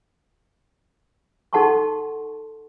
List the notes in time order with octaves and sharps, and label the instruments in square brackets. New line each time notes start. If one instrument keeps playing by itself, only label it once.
[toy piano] D#4 A4 F#5 A5 C6 C#6